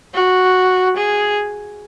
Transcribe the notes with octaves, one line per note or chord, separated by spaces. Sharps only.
F#4
G#4